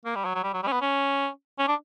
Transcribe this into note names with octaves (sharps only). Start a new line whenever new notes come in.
A#3
G3
F#3
F#3
G3
F#3
G3
C#4
B3
C#4
C#4
D4